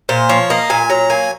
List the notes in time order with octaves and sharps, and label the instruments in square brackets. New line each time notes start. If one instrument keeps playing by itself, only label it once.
[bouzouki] A#2 [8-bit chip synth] C5
[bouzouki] F3 [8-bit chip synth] C#5
[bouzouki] A#3 [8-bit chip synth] D#5
[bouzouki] A#2 [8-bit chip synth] G#5
[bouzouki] F#3 [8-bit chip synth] A#5
[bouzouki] A#3 [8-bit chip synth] G#5